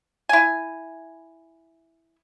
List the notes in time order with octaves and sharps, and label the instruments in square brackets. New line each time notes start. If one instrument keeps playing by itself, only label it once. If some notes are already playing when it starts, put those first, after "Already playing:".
[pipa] E4 G#5